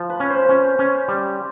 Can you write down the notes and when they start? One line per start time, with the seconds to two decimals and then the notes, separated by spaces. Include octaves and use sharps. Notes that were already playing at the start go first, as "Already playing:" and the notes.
Already playing: F3
0.10 B4
0.20 C#4
0.30 C5
0.49 C#4
0.79 C#4
1.08 G3